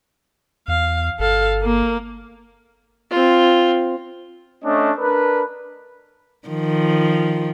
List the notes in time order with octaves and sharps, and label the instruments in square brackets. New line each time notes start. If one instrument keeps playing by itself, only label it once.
[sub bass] E2 [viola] F5
[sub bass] G1 [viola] A4 F5
[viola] A#3
[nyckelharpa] C4 F4
[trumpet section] A3 C#4 D4 D#5
D4 A#4 B4
[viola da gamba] D#3 F3